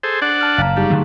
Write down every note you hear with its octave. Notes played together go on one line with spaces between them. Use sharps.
G#4 A4 C5
D4 D5 F#5
A5 F6
F#1 F5 A#5
G3 D#4 G4 G#4
D3 F#3 A3